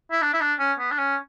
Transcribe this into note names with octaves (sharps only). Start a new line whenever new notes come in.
E4
D4
E4
D4
C#4
B3
D4
C#4